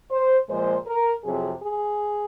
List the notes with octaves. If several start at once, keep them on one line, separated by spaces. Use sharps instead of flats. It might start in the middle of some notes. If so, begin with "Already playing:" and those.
C5
A#2 F3 G#3 C5
A#4
F2 C3 F#3 C4 G#4
G#4